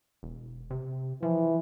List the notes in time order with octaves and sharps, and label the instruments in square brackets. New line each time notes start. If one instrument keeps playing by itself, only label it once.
[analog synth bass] E1
C3
[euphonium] E3 [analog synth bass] F3